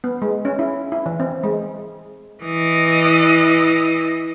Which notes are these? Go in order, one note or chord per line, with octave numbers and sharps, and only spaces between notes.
B3
G#3
C#4
E4
E4
E3
C4
G#3
E3 D#5